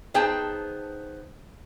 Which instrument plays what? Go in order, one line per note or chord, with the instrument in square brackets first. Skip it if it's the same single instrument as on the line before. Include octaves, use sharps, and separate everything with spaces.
[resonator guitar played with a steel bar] B3 D#4 G#4 C5 G5 A5